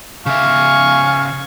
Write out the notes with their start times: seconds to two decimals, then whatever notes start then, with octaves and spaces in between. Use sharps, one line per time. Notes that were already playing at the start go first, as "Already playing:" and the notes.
0.26 C#3 E5 F5 G#5 C#6